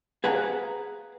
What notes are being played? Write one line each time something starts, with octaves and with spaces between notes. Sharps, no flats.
G#4 B4 F5 F#5 A#5